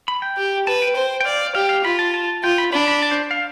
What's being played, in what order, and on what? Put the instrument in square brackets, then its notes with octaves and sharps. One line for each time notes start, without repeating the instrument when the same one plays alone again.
[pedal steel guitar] B5
G5
[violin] G4
[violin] B4 [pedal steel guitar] A5
[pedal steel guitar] G5
[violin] C5
[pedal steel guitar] G5
[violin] D5 [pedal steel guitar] F5
[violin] G4 [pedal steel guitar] F5
[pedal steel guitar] F5
[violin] F4 [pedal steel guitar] B5
[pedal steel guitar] A5
A5
[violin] F4 [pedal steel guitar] G5
[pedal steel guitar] B5
[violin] D4 [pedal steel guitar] B5
[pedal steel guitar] B5
A5
C5
F5